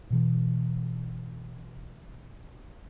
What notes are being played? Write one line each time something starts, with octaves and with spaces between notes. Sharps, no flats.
B2 E3